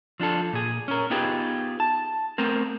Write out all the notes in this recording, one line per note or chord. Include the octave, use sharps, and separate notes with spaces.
F3 D4 F4 A4
A#2 G#4
C#4 A#4
B3 D#4 F4 G4 G#4 B4
A5
A3 B3 C4 A#4